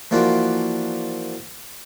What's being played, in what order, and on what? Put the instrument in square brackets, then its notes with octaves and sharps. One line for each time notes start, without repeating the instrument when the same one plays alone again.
[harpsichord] E3 F3 A#3 D4 F4 F#4